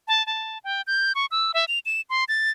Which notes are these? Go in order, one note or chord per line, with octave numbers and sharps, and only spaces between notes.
A5
A5
G5
G6
C#6
E6
E5
F7
E7
C6
A6